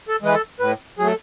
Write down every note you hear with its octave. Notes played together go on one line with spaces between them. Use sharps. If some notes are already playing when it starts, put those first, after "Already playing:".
A4
E3 G#3 B4
A4
A2 B4
F#3 A3 G#4 A4